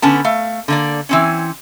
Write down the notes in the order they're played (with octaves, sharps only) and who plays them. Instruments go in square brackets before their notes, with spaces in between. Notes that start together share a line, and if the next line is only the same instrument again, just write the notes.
[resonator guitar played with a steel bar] D3 B3 C#4 A5
A3 F5
D3 A#3 D5
E3 C4 C#4